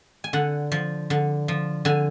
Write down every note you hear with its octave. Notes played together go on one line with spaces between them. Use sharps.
G#5
D3 F#5
F3
D3
F3
D3 G#5